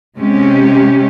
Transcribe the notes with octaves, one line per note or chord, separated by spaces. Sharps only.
C3 G#3 C#4 G4